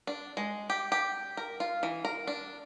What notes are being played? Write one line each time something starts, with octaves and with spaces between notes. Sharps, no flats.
D4
G#3
G4
G4
A#4
F4
E3
A#4
D4